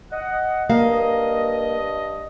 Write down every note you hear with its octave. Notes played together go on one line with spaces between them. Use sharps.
D#5 F#5
G2 A#3 D#5 F5